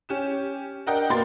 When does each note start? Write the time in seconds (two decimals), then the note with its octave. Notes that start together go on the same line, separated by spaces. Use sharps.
0.09 C#4 G4 E7
0.87 D4 A#4 D#5 F#5 G5
1.10 B2 A#3 C6 A6